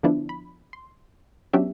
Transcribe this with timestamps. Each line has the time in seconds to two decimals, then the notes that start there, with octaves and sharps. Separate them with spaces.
0.03 D3 F3 B3 D4 E4
0.29 B5
0.73 C6
1.53 F#3 B3 C#4 D4 G4 E5